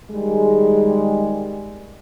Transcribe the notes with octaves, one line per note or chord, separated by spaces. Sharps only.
D#3 G3 G#3